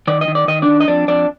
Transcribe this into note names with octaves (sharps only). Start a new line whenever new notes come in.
D#3 D5
D#5
D#3
D5
D#3 D#5
D4 D5
D#3
D#5
F2 D4 D5
F2 D4 D5